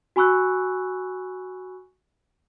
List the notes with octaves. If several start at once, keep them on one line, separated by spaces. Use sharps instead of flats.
F#4 G#5 B5 C#6 E6 F#6